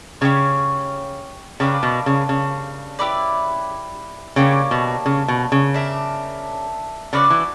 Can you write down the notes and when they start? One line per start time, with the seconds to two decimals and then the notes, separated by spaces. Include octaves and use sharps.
0.21 C#3 C#4 G4 C#5
1.60 C#3 A#3 D4 G4 B4
1.83 B2
2.06 C#3
2.29 C#3
2.99 E4 G4 B4 D5
4.36 C#3 A#3 D4 G4 C#5
4.71 B2
5.06 C#3
5.28 B2
5.52 C#3
5.74 D4 A#4 E5
7.13 C#3 D4 F#4 B4 D5
7.30 E3